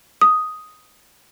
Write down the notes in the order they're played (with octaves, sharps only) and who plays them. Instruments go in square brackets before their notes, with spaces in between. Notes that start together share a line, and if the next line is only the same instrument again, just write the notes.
[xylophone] D#6